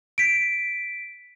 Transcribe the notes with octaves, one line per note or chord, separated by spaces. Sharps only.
B6 D7